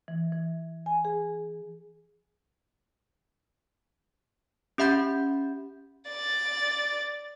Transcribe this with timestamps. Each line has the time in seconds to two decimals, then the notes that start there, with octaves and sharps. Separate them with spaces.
0.08 E3
0.32 E3
0.86 G#5
1.05 G#4
4.78 C#4 G4 E5 F#5 B5 G6
6.09 D5 A6